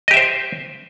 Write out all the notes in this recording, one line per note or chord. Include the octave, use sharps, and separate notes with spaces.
G4 C5 D#5 E5